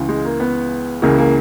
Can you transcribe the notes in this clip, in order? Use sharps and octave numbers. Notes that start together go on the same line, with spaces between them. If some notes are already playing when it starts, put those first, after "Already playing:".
Already playing: C#2 C#3 E3
G#3
A#3
B3
C#2 C#3 E3 A#3
A#3